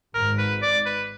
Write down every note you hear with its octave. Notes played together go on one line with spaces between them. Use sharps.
G#1 G#2 A#4
B4
D5
B4